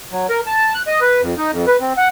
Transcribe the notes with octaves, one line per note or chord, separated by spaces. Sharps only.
F#3
A#4
A5
F#6
D#5
B4
F2
D#4
F2
B4
C4
F#5